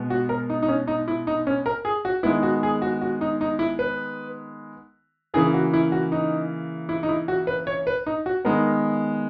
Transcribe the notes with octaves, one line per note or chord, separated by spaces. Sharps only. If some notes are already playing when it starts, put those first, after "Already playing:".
Already playing: B2 G#3 B3
F#4
A#4
D#4
D#4
C#4
D#4
E4
D#4
C#4
A#4
G#4
F#4
D#3 G#3 B3 E4
F#4
G#4
F#4
F#4
D#4
D#4
E4
B4
C#3 E3 A#3 G#4
F#4
E4
F#4
D#4
E4
D#4
E4
F#4
B4
C#5
B4
D#4
F#4
D#3 G#3 B3 A#4